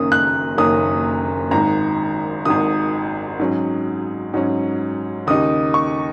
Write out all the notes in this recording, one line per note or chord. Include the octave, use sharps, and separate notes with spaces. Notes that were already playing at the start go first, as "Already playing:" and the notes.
Already playing: F#1 F#2 D#3 A#3 C#4 D#6
F#6
F#1 F#2 D#3 A#3 C#4 D#6
G#1 G#2 D#3 A#5
G#1 G#2 D#3 D#6
G#2 F#3 C#4
G#2 F#3 C#4
D#2 C#3 A#3 D#4 D#6
C#6